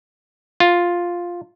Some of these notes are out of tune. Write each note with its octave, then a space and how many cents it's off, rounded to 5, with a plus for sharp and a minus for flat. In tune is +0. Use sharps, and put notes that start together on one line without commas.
F4 +5